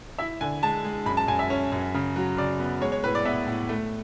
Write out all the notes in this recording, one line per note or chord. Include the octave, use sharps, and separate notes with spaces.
E4 E5
D3 G#5
G#3 A5
G#3
F#2 B5
A5
F#2 G#5
E5
C#4
F#2
C#3
F#3
C#3 D5
B3
G#3 C#5
C#5
A2 B4
D5
B3 E5
A2
A3